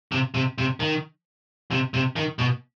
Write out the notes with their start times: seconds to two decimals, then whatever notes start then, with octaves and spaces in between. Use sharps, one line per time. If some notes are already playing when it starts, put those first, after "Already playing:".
0.12 C3
0.34 C3
0.58 C3
0.80 D#3
1.71 C3
1.94 C3
2.16 D#3
2.39 B2